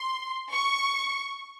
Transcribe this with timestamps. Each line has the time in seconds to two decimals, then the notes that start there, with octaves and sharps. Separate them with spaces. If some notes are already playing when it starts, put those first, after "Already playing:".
Already playing: C6
0.51 C#6